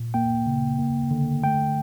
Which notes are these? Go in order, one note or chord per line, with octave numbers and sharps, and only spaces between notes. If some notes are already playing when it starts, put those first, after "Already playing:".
Already playing: A#2
A#3 G5
C#3
A#3
D3
A3 G5